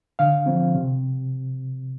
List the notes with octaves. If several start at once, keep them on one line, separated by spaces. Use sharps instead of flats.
D3 F5
F3 C4
C3